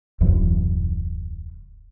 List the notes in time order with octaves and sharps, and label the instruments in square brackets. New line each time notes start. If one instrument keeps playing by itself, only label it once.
[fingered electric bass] D#1 C2 F#2 E3